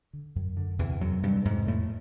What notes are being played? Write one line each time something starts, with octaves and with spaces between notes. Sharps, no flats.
D3
F#2
D3
E2 C3 E3
F#2 C3 F#3
G2 C3 G3
F2 G#2 G#3
F2 A2 A3